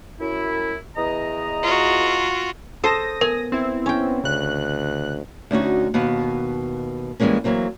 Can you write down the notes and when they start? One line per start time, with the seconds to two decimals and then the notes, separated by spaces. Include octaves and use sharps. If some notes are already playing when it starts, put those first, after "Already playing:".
0.20 F#2 E4
0.96 E2 D#5 A#5
1.63 F4 F#4
2.84 A4 C5 A5 D#6 A#6
3.21 B3 A#4 G#5
3.52 C4 E4
3.86 C#4 G5
4.24 D2 C#3 F#6
5.51 D2 C#4 D#4 F#4
5.94 D#2 B2 B3
7.20 E3 G3 G#3 A#3 C#4
7.44 E3 F#3 A#3 C4